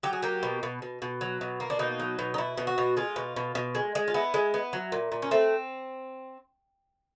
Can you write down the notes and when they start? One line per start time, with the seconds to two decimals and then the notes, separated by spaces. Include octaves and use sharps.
0.03 F#3 G4
0.13 G#4
0.23 A#3 G4
0.43 B2
0.63 B2
0.82 B2
1.02 B2
1.21 F#3
1.41 B2
1.60 A#3
1.70 D4
1.79 B2 D#4
2.00 F#3
2.19 B2
2.34 D#4
2.38 B2 E4
2.57 B2
2.67 F#4
2.78 B2
2.97 G#3 F4
3.16 B2
3.36 B2
3.55 B2
3.75 G#3
3.95 G#3
4.08 F4
4.14 B3 E4
4.34 G#3
4.54 B3
4.73 F#3
4.92 A#2
5.12 A#2
5.22 C#4
5.31 A3 C4